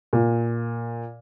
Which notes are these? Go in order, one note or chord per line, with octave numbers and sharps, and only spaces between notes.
A#2